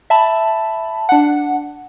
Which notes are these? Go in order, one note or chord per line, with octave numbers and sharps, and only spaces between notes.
E5 A5 B5
D4 F#5